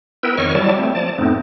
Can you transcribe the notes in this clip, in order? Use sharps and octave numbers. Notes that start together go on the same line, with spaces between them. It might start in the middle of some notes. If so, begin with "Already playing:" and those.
B3 E4 A#4 B4 G5 E6
F2 D#3 C#5 D#5 C#6 F6
F#3 G3 E4 D5 A5
A3 C4
F3 D5 A5
F2 A2 A3 B3 C4 D#4